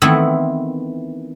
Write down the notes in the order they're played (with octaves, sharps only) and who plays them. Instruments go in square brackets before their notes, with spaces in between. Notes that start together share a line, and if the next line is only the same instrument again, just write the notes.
[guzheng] D#3 E3 A3 B3 C4 E4